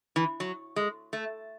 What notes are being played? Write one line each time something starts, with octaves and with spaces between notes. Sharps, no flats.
E3
F#3
G#3
A3